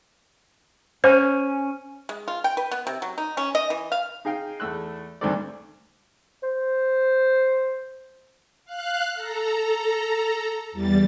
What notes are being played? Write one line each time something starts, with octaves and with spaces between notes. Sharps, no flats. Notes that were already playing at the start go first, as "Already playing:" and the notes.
C#4 C5
G#3
F4
G5
B4
B3
C3
F#3
D#4
C#4
D#5
E3
F5
D#4 G#4 F5 G5
E2 A3 E6 F#6
D2 G2 D#3 C4 A4 D5
C5
F5 F#6
A4 A#5
E2 G3 A6